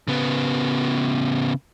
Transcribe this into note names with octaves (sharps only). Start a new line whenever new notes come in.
C#3 B3